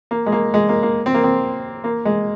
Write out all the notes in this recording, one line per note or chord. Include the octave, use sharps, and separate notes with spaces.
A#3
G#3
A#3
G#3
A#3
A#3
C4
A#3
C4
A#3
G#3